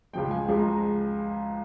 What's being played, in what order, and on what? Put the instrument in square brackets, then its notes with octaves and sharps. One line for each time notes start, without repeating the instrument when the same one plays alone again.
[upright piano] C#2 C#3 F3 G#3 G5
G#5
C#2 C#3 F3 G#3
A#5
A#5